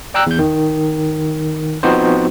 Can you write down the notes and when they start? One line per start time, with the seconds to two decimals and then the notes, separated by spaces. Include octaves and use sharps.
0.14 D5 G5 A#5 E6 F#6
0.27 E2 G6
0.39 D#3
1.83 F3 B3 C4 D#4 F#4 C5